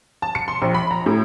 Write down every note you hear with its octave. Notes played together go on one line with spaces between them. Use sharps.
A5
C#7
C6
A#1
B5
A#5
A2